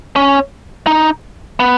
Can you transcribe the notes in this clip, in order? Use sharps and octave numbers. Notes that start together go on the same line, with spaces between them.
C#4
D#4
B3